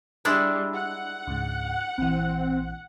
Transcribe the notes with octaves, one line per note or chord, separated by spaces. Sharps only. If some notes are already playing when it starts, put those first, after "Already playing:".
G3 G#3 D4 E4
F#5
C#2 G#2
A#1 E3 C4